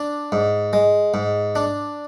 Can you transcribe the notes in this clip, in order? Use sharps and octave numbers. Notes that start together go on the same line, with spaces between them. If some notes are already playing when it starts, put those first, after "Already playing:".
Already playing: D4
G#2
G#3
G#2
D4